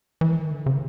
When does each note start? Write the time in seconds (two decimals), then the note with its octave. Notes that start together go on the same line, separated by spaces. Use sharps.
0.21 E3
0.36 D#3
0.51 D3
0.66 C#3